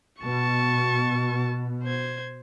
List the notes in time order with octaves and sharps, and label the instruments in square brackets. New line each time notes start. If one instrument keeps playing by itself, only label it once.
[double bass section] B2 [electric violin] A5 C#6
[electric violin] C5 G#6